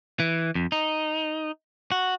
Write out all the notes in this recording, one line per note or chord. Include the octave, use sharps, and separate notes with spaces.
E3
F2
D#4
F#4